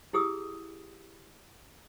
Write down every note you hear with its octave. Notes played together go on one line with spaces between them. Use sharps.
E4 G4 G#4 D#6 E6